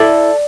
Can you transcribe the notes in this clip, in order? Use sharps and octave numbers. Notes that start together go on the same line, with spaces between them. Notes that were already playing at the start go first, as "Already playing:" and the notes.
Already playing: E4 A4 D5